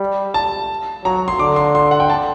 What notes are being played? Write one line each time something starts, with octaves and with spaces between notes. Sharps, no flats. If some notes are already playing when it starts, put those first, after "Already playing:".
Already playing: G3
A5
F#3 A#5
C6
D3 D6
C6
C6
F#5
G5
A5